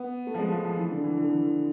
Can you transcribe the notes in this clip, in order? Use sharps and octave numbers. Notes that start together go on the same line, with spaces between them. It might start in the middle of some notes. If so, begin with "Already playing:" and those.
Already playing: B3
A3
F3
G#3
F3
F3
E3
D3
E3
D3
E3